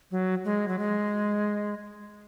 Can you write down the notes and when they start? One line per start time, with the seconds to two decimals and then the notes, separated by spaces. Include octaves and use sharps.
0.11 F#3
0.45 G#3
0.68 F#3
0.79 G#3